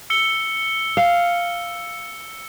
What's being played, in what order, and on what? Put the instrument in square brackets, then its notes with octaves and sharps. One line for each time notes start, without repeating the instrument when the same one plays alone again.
[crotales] E6 C#7 G7
[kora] F5